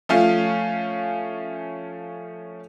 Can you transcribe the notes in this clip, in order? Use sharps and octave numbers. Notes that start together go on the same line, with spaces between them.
F3 A3 C#4 F5